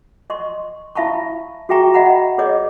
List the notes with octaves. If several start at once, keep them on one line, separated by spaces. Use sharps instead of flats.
D#5 C6 C#6
E4 E5 F5 A5 B5 C#6
F#4 G#4 E5 G5 A#5 C#6
D#5 E5 F#5 A#5 B5
G#4 B4 C#5 D#5 D6